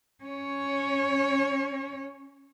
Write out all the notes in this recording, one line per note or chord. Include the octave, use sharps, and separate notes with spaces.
C#4 C#5